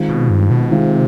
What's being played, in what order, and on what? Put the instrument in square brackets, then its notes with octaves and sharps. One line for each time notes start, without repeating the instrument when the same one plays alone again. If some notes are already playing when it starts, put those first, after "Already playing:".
Already playing: [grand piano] D#3 G#3 C4 F4
[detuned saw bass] B2
G2
B2
[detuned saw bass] C3 [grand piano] D#3 G#3 C4 F4